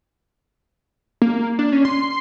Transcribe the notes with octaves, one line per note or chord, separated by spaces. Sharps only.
A#3
D4
C#4
C6